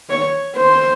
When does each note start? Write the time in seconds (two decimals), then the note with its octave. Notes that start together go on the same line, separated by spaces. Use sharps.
0.10 C#5
0.57 C5